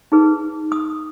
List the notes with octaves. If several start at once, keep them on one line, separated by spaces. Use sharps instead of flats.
D#4 G#4 B4
D#6